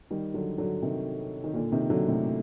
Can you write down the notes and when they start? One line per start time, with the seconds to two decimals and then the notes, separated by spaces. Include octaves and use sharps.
0.11 D#3 G3
0.34 D3 F#3
0.58 D3 F#3
0.82 C3 D#3
1.44 D#3
1.54 A#2 D3
1.72 C3 D#3
1.90 D3 F#3
2.08 A2 C3